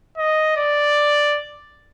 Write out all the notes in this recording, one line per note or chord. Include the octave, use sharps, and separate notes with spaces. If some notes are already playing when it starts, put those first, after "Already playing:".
D#5
D5